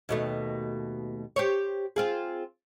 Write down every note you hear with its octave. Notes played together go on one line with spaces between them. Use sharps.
D#2 B2 A3
G4 C5 C#5
C4 F4 G#4